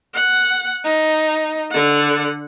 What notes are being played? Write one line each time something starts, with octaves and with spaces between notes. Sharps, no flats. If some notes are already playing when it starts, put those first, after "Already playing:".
F#5
D#4
D3 F#5